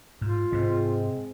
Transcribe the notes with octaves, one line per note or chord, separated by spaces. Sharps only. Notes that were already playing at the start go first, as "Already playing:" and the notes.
G#2 F4
G#2 C3 G#3 C4